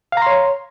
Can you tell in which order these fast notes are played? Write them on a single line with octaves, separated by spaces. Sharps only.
F5 A#5 C6 C#5